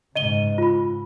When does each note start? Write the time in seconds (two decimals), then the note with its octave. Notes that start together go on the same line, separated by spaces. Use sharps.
0.16 G#2 C#3 D#5 D#7 G7
0.58 F4 B5